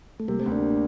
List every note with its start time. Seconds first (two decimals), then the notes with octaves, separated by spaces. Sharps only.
0.20 A3
0.28 C3 G3 A#3
0.39 A3 C4
0.46 D2
0.52 A#3 D4